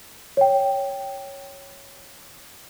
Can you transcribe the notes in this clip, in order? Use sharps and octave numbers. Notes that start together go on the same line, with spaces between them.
C#5 G5